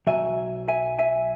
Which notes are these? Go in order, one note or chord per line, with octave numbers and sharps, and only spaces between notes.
B1 B2 F#3 E5 G#5
E5 G#5
E5 G#5